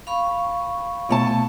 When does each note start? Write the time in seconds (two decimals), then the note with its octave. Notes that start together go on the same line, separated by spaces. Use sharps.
0.07 F5 B5 C#6
1.09 B2 A3 A5